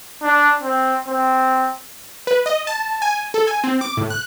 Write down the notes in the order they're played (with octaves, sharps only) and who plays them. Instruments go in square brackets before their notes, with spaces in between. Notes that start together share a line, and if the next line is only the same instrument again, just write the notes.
[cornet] D4
C4
C4
[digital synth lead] B4
D#5
A5
G#5
A4
G#5
C4
D6
A2
F#6